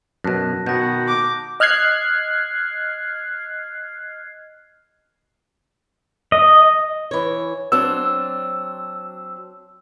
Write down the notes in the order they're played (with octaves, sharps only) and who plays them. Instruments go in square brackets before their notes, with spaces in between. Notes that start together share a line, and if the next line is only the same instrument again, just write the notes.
[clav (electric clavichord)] F#2 B2 [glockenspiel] A5 F#6 A#6
[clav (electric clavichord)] B2 [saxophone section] D#3 B3 F#4 [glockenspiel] G6 A#6
[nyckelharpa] D6
[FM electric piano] D#5 F6 F#6 G#6 C7
[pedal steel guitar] D#5
[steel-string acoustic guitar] E3 C#5
[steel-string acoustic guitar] F#3 C4 D4 [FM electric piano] E6